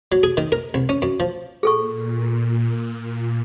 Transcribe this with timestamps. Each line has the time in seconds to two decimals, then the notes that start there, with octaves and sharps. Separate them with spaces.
0.12 F#3
0.23 G#4
0.37 D#3
0.52 A#4
0.74 C2
0.89 C#4
1.02 F#2
1.20 F3
1.63 A#2 G#4 A4 C#6